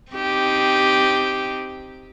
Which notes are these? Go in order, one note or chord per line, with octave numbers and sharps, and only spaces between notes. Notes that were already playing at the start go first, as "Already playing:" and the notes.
C4 D#4 G4